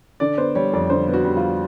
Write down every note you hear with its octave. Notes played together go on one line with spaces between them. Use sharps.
D3 D5
B3 C5
G3 C#5
F2 D5
D3 C5
B3
F#4
G3
F4